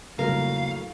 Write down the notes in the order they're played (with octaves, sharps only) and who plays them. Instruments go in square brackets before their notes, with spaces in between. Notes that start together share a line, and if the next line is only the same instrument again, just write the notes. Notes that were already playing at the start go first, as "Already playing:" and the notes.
[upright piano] F2 A2 F#3 [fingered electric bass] C#3 G3 A#3 [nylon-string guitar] A#4 [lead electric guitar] F5